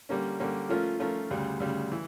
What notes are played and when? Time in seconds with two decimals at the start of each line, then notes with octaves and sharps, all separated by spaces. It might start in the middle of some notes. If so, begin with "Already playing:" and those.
0.09 D3 G3 A#3 C#4
0.40 D3 G3 A#3 C#4
0.69 F3 A3 C#4 F4 A#4
0.99 F3 A3 C#4 F4 A#4
1.31 D2 C#3 G3
1.60 D2 C#3 G3
1.92 E3